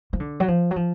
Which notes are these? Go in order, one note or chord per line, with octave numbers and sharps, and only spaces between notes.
F3
D3
F#3
F3
F#3
F3